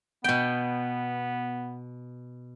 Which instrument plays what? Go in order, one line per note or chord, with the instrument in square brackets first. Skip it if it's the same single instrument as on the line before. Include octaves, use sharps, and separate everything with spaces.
[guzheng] B2 G5 [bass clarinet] B3